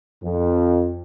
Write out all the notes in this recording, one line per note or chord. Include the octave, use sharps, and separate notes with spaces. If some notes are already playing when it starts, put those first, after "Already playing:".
F2